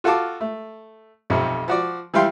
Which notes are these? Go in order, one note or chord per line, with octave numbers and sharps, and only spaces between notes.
F4 F#4 A4 F5 A5 D6
A3
B1 F2 C3
F3 F#4 D5
E3 G3 E4 F5 G5 C6